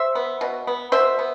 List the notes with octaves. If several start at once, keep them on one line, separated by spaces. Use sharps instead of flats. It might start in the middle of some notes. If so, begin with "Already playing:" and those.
Already playing: C5 E5
B3
B2
B3
B2 C5 E5
B3